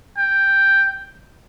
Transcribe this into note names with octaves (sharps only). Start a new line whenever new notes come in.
G5